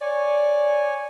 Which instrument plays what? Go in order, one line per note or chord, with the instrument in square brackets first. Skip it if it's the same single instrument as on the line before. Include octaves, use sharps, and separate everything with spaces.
[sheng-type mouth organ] C#5 G#5 [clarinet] D5